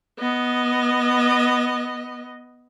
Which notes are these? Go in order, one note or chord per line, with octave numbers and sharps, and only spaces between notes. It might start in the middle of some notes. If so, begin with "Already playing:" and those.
B3 D#5